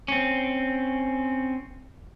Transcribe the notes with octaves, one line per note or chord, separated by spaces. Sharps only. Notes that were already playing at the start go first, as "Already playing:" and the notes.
C4 C#4